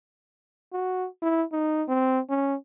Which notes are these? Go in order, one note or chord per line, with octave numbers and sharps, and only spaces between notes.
F#4
E4
D#4
C4
C#4